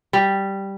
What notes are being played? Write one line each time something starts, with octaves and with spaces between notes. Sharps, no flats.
G3